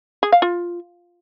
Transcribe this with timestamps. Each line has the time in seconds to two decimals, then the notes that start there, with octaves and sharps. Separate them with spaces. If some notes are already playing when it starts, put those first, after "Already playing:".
0.23 G#4
0.32 F5
0.42 F4